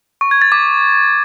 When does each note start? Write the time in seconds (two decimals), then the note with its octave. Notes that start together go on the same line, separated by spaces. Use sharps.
0.21 C#6
0.31 G#6
0.42 A6
0.52 D6